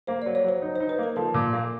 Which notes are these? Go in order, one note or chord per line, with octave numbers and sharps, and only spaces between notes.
A#3 C5
F#3 D5
C#5
F#3 C5
D#4
D#4 C5
B4
A#3 A#4
F3 A4
A#2
A#3